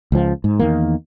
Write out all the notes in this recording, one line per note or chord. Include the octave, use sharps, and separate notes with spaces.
C#2 F3
G#2
E2 D#3 A#3